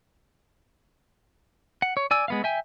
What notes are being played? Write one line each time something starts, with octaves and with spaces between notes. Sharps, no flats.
F#5
C#5
D5 G#5 E6
G#3 B3 F5
E5 G5 G#5